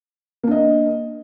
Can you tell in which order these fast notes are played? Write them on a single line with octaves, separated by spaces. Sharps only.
A#3 D4 D#5